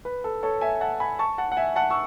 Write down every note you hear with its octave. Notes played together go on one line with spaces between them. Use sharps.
B4
A4
A4 C#5
E5 G#5
F#5 A5
G#5 B5
A5 C#6
F#5 A5
F#5
E5 G#5
F#5 A5
C#6 E6